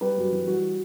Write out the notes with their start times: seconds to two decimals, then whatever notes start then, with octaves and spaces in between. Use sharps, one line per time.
0.01 G3 G4 B4
0.17 F#2
0.32 E3
0.47 G3 F#4